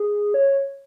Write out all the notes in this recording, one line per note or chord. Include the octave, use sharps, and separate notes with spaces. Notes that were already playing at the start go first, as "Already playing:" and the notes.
Already playing: G#4
C#5